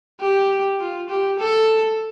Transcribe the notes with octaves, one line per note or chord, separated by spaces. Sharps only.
G4
F4
G4
A4